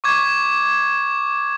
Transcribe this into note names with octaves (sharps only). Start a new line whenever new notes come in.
C#6 D6 G#6